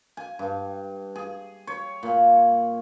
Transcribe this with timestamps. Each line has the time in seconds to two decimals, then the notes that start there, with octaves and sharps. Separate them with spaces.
0.17 G#5
0.39 G2
1.16 G#4
1.67 C#5
2.03 A#2